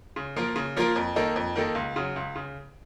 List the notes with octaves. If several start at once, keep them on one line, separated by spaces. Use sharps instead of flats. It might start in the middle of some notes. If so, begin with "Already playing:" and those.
C#3
F3 A#3 F4 A#4
C#3
F3 A#3 F4 A#4
F2
D#3 A#3 D#4 A4
F2
D#3 A#3 D#4 A4
C#2
C#3 F#3
C#2
C#3